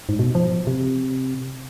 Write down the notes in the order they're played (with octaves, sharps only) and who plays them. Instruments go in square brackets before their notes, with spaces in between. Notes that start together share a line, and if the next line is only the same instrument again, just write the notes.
[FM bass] G#2
B2
F3
C3